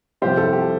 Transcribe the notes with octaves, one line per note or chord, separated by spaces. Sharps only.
C2 C3 F3 G4 C5
A4
G4